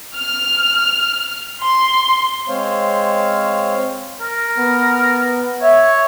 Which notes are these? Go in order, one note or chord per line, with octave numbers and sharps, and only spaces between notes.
F6
C6
G#3 C4 C5 C#5 F5
A#4
B3
C#5 E5